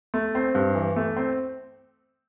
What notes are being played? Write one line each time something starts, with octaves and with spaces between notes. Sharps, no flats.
A3
C4
G2
E3
A3
C4